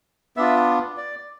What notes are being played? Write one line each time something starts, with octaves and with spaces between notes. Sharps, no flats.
B3 D4 F4 E5
D5